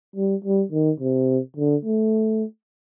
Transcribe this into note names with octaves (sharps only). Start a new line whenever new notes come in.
G3
G3
D#3
C3
D3
A3